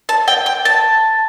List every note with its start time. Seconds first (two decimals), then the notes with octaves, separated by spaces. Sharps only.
0.09 A5
0.28 G5
0.46 G5
0.65 A5